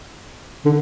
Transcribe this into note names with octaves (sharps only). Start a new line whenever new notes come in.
D3